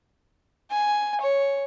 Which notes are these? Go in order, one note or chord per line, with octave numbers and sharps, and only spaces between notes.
G#5
C#5